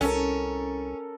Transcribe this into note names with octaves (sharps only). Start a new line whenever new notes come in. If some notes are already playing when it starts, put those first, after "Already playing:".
C2 C#4 A4 A#4